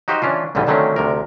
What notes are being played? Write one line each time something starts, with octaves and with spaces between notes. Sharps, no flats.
D#4 F#4 G4 C5 D#5 F5
E3 C#4 D4 F4
C2 G#2 D3 E3 G3 B3
D3 D#3 F#3 A3 C4 C#4
D2 C3 A#4